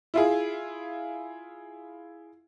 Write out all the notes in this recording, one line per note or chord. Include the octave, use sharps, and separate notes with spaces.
E4 F4 G#4